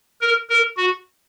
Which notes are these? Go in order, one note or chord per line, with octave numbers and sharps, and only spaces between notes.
A#4
A#4
F#4